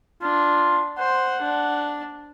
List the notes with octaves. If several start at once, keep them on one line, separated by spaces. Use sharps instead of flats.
D4 F4
C5 F#5
D4